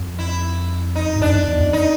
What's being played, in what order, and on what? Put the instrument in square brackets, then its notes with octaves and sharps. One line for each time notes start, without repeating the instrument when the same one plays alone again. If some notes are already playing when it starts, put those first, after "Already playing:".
Already playing: [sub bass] F2
[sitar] E4
D#4
[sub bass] G2
[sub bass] F#2 [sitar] D4
[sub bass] F2
E2
F2
[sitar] D#4